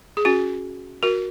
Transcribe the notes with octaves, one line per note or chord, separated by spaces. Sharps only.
G#4
C#4 F#4
F#4 A#4